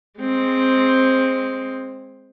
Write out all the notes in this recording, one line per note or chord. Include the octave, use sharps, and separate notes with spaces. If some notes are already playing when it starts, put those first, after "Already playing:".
G#3 C4